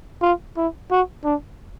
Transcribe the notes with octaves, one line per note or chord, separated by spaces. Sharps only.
F4
E4
F#4
D4